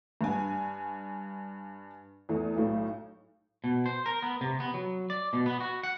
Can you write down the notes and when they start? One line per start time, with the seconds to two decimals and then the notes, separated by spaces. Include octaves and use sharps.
0.21 G2 G#5
2.29 E2 A3
2.56 B1 A2
3.64 B2
3.86 C5
4.06 A#4
4.22 B3
4.41 C3
4.60 B3
4.74 F#3
5.10 D5
5.33 B2
5.46 B3
5.60 F#4
5.83 F#5